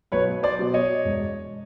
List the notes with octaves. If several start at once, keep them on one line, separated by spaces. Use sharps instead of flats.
B1 B4 C#5
C5 D5
B2 F#3
C#5 D#5
E1